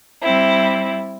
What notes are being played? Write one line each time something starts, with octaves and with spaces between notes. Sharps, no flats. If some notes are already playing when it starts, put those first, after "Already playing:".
G3 C4 E4